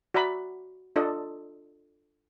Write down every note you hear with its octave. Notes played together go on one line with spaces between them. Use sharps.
F#4 D5 E5 A#5 B5
D4 F4 A4 D5 D#5